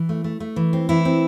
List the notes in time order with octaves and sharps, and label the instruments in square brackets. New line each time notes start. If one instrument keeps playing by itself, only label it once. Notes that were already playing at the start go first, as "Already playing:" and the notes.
Already playing: [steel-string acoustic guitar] E3
A3
A3
A3
E3
C4
E3 E4
C4